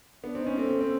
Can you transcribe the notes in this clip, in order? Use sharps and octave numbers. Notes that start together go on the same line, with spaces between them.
B3 D4
C4
D#4
C#4
C4 A4
C4
C4